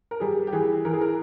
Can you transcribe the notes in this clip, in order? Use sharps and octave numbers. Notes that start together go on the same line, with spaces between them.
A#4
G3 G#4
G4
E3 G#4
E3 A#4
G#4
A#4